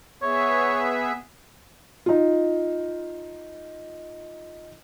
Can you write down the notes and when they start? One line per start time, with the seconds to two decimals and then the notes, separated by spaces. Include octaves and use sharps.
0.23 B3 G#4 C#5 E5
2.06 D#4 F4